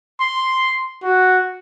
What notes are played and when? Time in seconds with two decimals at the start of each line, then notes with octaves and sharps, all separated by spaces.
0.20 C6
1.03 F#4